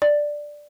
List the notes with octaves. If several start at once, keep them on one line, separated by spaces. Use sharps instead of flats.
D5